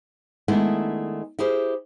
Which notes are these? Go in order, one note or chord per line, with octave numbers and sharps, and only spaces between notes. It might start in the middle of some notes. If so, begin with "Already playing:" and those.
D#3 G#3 A3 B3 D4 E4
E4 G4 G#4 C5